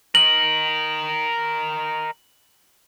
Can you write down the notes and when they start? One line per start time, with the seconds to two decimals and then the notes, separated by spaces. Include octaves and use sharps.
0.15 A#4 D#5 F#7